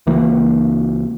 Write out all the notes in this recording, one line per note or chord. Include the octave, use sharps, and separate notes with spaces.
C#2 E3 A#3